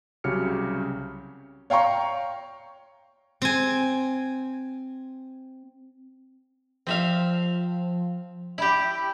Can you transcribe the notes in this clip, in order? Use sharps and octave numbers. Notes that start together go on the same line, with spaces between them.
C2 C#3 F#3 G4 F6 C#7
C#5 F5 G5 A#5 C#6
C4 G#5
F3 C4 E5 F5
E4 G4 B5